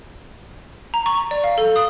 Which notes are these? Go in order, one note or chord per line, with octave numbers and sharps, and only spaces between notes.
A#5
C#6
D5
F5
A4
D#6